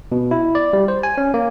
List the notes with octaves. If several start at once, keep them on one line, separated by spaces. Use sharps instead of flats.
B2
E4
D5
G3
C5
G#5
C#4
A#3